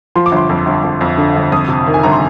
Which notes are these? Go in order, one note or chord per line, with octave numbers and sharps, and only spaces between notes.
F3 C6
D6
G1 C6
F2
G1
F2
F2
D3
G1
F2 D#6
C3
D#3
G#5
G1 A#5
C6